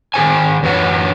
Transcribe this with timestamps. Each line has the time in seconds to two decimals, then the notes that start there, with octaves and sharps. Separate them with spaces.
0.14 D#3 G#4 C5 G#5
0.63 F#2 E3 F#3 D4 C#5 F#5